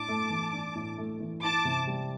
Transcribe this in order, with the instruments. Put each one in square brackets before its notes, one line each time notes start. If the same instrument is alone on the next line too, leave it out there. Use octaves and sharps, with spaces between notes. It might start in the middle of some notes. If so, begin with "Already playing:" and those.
Already playing: [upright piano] A2 D4 [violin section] A5 D6
[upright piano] A3
E3
D4
A2
A3
E3
[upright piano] E4 [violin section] A5 D6
[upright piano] C3
G3